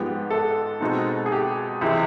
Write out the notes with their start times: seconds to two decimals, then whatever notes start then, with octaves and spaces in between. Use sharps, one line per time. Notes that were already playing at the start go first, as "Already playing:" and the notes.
Already playing: G#2 F3 G#3 B3 G4
0.30 A4
0.80 B2 G#3 C4 D#4
1.26 G#4
1.32 G4
1.81 C#2 C3 E3 G#3